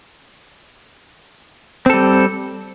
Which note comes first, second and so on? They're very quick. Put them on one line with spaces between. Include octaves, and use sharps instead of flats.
C4 A4 G3